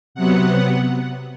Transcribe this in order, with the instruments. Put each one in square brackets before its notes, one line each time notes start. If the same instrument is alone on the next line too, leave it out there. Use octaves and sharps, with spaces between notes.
[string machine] C3 F#3 B3 F#5